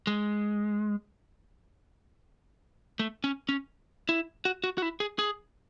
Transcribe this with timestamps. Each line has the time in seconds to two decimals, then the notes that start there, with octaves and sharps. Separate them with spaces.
0.07 G#3
2.99 A3
3.24 C#4
3.49 C#4
4.09 E4
4.45 F#4
4.64 F#4
4.78 F#4
4.82 E4
5.00 G#4
5.19 G#4